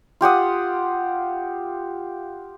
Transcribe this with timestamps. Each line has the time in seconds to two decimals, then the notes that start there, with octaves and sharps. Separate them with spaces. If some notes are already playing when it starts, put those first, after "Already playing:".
0.21 F4 G4 F#5 D#6